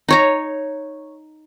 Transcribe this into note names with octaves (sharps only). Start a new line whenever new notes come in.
D#4 C#5 A#5